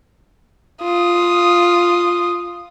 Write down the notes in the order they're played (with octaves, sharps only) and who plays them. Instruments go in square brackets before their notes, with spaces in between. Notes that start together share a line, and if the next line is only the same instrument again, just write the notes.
[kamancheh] F4 D#6